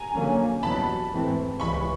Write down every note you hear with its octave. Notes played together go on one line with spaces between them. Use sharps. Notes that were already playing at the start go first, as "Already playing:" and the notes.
Already playing: G#5 A#5
F2 D3 F#3 A#3 C#4
E2 B2 F#3 A5 B5
G#2 E3 A3 C4
C#2 C#3 E3 G#3 B5 C#6